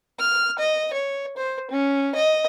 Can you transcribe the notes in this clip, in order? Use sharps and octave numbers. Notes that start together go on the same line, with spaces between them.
F6
D#5
C#5
C5
C#4
D#5